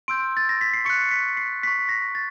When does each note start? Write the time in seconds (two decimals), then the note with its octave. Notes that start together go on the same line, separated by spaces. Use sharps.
0.08 C6 E6 G6 D7
0.37 A6
0.49 A#6
0.61 B6
0.74 C7
0.85 C#6 F#6 C#7
1.11 B6
1.37 C7
1.63 C#6 F#6 B6
1.89 A#6
2.15 A6